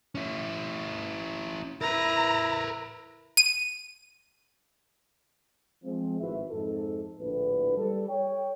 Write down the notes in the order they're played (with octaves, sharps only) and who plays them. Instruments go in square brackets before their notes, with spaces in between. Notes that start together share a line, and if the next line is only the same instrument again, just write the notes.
[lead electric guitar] C#4 E4
[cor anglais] E4 [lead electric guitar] A#4 B4 [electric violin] A#5
[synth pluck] D#7
[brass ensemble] F3 G#3 C4
G#1 A2 E4 F#4 B4 E5
F2 G#2 A4
A#1 A2 D3 E4 B4
G3 A4
C#5 G5